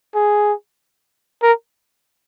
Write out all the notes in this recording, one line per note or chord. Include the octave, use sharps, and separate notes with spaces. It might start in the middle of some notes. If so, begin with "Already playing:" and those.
G#4
A#4